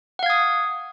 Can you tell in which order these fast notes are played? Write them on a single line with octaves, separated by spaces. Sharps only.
F#5 F5 G#6 D#6